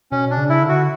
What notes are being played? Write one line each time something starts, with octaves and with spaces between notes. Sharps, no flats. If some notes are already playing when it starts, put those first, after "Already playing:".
B2 C#4
D4
C#3
E4
D3
F#4